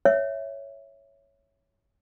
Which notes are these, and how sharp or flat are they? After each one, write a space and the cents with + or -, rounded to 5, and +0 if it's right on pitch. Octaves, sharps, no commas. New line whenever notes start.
C#5 +0 E5 +0